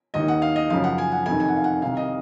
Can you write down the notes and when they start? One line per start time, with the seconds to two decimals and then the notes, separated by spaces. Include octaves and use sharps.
0.14 D#2 D#3 D#5
0.28 F#5
0.42 F5
0.56 D#5
0.70 F#2 C#3 F3 F5
0.84 F#5
0.98 G#5
1.12 F#5
1.26 F2 C3 D#3 G#5
1.40 G#5
1.48 F#5
1.56 F5
1.64 F#5
1.82 C2 C3 D#3 F5
1.97 D#5